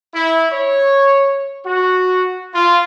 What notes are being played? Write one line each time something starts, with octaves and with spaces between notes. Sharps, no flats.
E4
C#5
F#4
F4